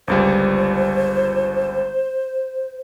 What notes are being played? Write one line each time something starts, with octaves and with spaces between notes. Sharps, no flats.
G1 C#2 G3 C5